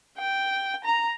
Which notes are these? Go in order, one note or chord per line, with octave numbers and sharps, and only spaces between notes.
G5
A#5